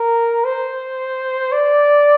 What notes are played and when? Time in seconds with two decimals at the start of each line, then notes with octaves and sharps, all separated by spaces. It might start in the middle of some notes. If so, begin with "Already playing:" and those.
Already playing: A#4
0.45 C5
1.52 D5